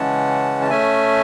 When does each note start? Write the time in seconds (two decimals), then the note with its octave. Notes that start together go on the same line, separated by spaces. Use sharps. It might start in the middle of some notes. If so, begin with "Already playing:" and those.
Already playing: C#3 E3 G#3 C#4 F#5 A5
0.61 A5
0.70 A3 C#4 E5 G#5